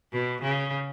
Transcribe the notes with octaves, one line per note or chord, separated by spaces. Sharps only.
B2
C#3